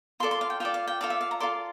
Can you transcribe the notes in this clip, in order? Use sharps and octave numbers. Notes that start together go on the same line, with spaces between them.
F4 A4 D5 C6
C6
F5
G5
F4 A4 D5 G5
F5
G5
F4 A4 D5 F5
E5
F5
A#5
F4 A4 D5 C6